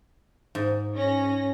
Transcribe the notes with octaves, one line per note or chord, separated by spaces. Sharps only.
G#2
C#4 A#6